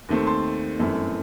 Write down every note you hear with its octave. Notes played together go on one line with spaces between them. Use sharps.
D#2 D#3 A3 C4
A5 C6
G1 F#2 E3 A3 C4